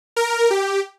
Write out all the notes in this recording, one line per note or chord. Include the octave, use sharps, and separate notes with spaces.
A#4
G4